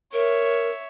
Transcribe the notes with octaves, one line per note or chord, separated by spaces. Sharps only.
A#4 C#5 E5